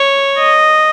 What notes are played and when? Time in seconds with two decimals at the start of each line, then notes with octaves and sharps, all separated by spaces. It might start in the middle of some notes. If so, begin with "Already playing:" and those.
Already playing: C#5
0.38 D#5